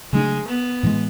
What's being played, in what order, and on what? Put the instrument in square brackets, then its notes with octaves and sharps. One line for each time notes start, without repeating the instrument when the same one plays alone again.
[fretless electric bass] C#3 F#3 A3 D4 [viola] G#3
[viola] B3
[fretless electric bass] A2 E3 G#3